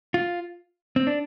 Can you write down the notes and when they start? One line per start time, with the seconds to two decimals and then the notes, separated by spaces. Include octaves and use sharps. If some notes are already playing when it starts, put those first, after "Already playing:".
0.14 F4
0.96 C4
1.07 D4